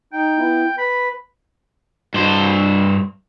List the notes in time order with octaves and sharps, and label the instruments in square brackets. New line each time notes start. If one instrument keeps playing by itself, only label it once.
[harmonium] D#4 [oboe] G5
[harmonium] B3 E4
[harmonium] B4 [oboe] B5
[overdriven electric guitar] G2 C5